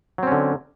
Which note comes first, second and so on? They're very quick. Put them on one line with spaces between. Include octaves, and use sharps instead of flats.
F#3 C4 C#4 D3